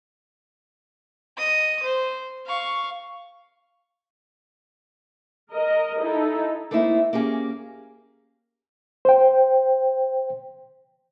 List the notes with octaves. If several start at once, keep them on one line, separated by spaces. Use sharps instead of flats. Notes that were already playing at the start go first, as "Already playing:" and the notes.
D#5 D#6
C5
F5 C#6
A#4 D#5
D#4 E4 A4
A3 A#3 C4 D#4 E4
A#3 C#4 G4 G#4
C5 G5